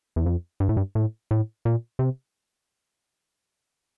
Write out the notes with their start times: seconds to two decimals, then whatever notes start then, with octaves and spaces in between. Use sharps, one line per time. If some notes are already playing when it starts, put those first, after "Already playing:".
0.16 E2
0.26 F2
0.60 G2
0.69 A2
0.77 G2
0.95 A2
1.31 A2
1.65 A#2
1.99 C3